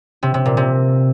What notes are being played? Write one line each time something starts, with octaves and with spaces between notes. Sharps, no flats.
C3
C3
A#2
C3